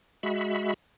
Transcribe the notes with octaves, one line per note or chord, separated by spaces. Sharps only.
G#3 F#4 E5 B5